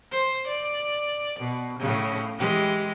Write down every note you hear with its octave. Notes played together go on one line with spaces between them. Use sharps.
C5
D5
B2
A2 C#3
E3 G#3 G4